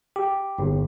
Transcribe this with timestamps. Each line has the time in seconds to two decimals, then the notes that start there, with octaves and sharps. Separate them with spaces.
0.16 G4
0.59 G1